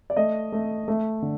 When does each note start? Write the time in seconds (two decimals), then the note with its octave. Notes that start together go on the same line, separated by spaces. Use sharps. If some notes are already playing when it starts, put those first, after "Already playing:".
0.10 D5
0.16 A3 D#5
0.52 A3
0.88 A3
1.22 D3